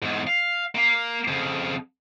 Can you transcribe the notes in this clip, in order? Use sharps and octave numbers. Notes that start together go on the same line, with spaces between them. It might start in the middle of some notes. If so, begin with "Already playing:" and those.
E2 G#2
F5
A#3 F5
F2 C#3